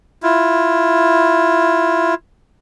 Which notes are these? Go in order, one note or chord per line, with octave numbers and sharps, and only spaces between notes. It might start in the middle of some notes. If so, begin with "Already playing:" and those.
E4 F4